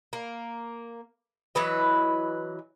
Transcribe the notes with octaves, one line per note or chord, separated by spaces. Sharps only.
A#3
E3 F#3 B4 D#5